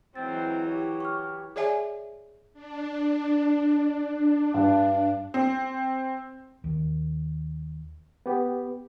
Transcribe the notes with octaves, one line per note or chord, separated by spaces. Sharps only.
G#2 E3 F#3 C4 A6
G4 C#5
C#6 F6
G#4 C#5 D5 E5 G#5
D4
G2
C4
D#2
B3 G4